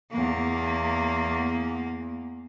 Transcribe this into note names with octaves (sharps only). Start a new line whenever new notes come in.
E2 A#3